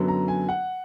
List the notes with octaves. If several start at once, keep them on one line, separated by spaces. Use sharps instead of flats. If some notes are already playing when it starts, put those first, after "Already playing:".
Already playing: F#2 D3 F#3 B3
A#5
G#5
F#5